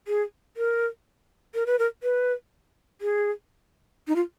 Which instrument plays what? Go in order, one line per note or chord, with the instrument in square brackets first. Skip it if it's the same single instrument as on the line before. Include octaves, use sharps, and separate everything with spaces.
[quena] G#4
A#4
A#4
B4
A#4
B4
G#4
D#4
F4